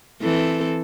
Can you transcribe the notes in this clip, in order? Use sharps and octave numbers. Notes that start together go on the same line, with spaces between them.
E3 C4 A4